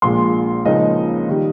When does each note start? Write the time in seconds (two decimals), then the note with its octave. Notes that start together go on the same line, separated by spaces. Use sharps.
0.02 A#1 A#2 G#3 C6
0.65 C#2 C#3 F3 A#3 D#4 D#5
1.29 D#3 G3